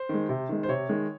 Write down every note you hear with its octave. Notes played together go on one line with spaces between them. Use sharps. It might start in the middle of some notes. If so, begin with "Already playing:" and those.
Already playing: C5
D#3 G#3
C3
D#3 G#3
C5
C3 C#5
D#3 G#3